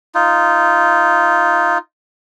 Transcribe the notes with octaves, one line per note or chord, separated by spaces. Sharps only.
D#4 F4